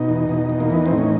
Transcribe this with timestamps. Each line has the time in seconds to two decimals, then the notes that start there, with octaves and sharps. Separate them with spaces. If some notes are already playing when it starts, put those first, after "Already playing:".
Already playing: B2 D#4
0.09 E2
0.29 B2
0.49 E2
0.60 A#3
0.70 E3 B3
0.86 C4
0.91 A2
0.98 C#4